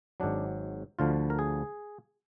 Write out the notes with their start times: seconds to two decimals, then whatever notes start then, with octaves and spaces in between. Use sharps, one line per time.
0.20 G#1 G#2 F#3 D4
0.99 D2 D3 F3 F4
1.30 A#4
1.39 G#4